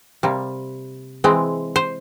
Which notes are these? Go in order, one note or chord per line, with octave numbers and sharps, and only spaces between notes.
C3 G3 A#3
E3 G#3 C4
C5